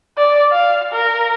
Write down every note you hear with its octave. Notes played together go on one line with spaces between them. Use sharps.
D5
F5
A#4